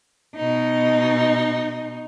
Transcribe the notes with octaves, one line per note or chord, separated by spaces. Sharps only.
B2 D#4